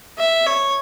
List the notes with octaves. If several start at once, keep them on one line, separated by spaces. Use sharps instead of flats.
E5
C#5